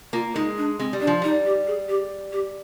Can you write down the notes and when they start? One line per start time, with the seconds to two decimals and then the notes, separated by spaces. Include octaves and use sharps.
0.13 A#3 F4
0.35 G#3 D#4
0.58 D4
0.79 G#3 C4
0.93 G3
1.01 D4
1.07 F3
1.22 G3 D#4
1.45 G4
1.67 G#4
1.89 G4
2.33 G4